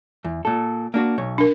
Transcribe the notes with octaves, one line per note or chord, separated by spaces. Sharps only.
E2
A#2 A4
A#3 D4 F#4
B1 C#5
D4 A#4